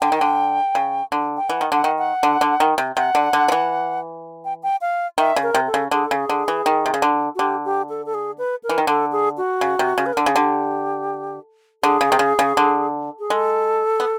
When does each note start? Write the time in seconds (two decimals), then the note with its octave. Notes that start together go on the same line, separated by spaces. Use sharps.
0.01 D3 G5
0.12 D#3
0.21 D3
0.75 C#3
1.12 D3
1.37 G5
1.49 E3 F#5
1.61 D#3
1.72 D3 F#5
1.84 D#3
1.98 F#5
2.23 D3
2.41 D3
2.60 D#3
2.78 C3
2.97 C3 F#5
3.15 D3
3.33 D3
3.48 F3
3.52 E3
4.45 G5
4.63 G5
4.81 F5
5.18 D#3 E5
5.36 C#3
5.43 A#4
5.55 C3
5.67 A4
5.74 C#3
5.91 D3 G#4
6.04 A4
6.11 C#3 G#4
6.29 D3
6.48 E3
6.66 D#3
6.86 C3
6.94 C#3
7.02 D3
7.35 F#4
7.39 D3 G4
7.65 G4
7.89 A4
8.06 A4
8.14 G#4
8.38 B4
8.63 A#4
8.69 E3
8.78 D#3
8.87 D3 A4
9.12 G#4
9.37 F#4
9.61 C#3
9.79 C3
9.98 C#3
10.06 B4
10.13 A#4
10.17 D3 A4
10.26 C#3 G#4
10.35 D3 G4
11.83 D3 G#4
12.01 C#3
12.12 C3
12.19 C#3
12.39 C#3
12.57 D3
13.19 G#4
13.30 G#3 A4
14.00 B3